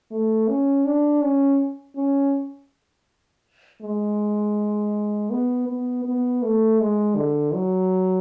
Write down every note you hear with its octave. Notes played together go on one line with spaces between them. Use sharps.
A3
C#4
D4
C#4
C#4
G#3
B3
B3
B3
A3
G#3
D3
F#3